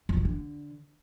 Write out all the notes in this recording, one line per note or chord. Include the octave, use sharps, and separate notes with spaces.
F2
B2
D3